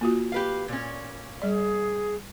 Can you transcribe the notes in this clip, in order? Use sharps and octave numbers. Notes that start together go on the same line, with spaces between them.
A#3 F4 F#4
G4 B4 F5
A#2 C#4
G3 G#4 D5